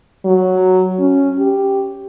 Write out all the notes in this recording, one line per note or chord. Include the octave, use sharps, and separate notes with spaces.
F#3
C#4
G4